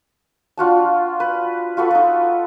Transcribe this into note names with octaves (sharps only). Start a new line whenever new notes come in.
D4 F4 F#4 A5
B4
F4 F#4 A4 B4
D#4 A4